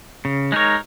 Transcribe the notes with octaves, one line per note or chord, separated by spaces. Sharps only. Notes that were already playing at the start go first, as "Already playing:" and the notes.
C#3
G#3 D#4 A#4 C#5